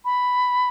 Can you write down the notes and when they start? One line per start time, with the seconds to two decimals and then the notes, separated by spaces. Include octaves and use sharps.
0.05 B5